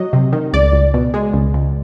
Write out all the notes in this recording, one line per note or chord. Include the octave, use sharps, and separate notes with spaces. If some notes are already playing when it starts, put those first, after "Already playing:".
Already playing: F#3 D#5
C3
D#3
C#2 D5
C#2
B2
G#3
C#2
C#2